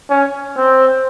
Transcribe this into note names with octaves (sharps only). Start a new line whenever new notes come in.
C#4
C4